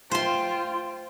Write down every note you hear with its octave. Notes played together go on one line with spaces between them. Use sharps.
F4 C5 G5 C6